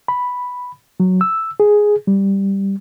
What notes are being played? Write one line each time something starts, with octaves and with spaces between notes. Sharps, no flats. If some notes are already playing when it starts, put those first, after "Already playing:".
B5
F#3
E6
G#4
G3